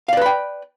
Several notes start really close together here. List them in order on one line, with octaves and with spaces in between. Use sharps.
F5 D5 B4 B5 G5